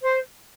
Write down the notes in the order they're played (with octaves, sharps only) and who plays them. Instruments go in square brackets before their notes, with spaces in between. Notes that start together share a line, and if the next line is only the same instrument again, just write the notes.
[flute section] C5